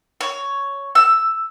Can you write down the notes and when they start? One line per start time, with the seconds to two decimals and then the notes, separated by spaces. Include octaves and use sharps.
0.21 C#5
0.95 E6